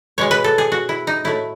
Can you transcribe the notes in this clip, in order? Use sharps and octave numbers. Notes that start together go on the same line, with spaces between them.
B2 G#3 C#5
B4
A4
G#4
F#4
E4
D#4
A2 F#3 A3 E4